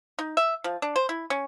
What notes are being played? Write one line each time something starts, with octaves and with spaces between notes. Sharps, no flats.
D#4
E5
F3
D4
C5
E4
C#4